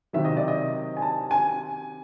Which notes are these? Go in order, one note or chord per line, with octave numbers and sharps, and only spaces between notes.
C3 D#3 F#3 E5
D#5
D5
D#5
G#5
A5
G#5